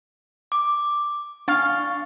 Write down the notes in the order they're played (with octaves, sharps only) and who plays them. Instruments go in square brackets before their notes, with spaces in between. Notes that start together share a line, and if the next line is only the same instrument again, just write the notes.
[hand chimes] D6
[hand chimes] D4 C#6 A6 [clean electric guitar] F5